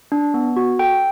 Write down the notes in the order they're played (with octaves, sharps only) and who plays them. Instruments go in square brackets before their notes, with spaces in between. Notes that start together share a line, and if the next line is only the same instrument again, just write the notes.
[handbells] D4
B3
F#4
A4 G5